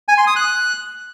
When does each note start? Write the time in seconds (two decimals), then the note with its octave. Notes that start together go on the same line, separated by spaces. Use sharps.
0.08 G#5
0.18 C6
0.27 D#6
0.36 F#6